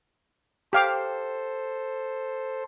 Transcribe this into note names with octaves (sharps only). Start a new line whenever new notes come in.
G4 A4 C5 F5 D6